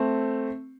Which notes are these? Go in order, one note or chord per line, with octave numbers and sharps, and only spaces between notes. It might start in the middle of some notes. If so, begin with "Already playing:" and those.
Already playing: A3 C4